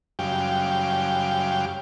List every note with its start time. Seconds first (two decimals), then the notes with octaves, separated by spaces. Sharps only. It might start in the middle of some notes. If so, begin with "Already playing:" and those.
0.19 F#2 C#3 G3 G4 F5 G5